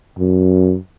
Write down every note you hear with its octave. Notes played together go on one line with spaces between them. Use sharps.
F#2